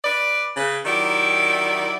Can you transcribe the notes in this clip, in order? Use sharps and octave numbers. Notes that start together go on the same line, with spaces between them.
B4 D5
C#3 B4
D#3 F#3 E4 G4 D5